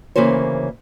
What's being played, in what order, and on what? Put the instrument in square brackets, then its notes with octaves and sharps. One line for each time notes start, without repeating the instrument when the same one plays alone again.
[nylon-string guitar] D2 C#3 E3 A#3 C5 C#5